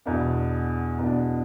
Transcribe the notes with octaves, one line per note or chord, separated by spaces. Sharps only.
E2 B2 B3 D4
E2 B2 B3 D4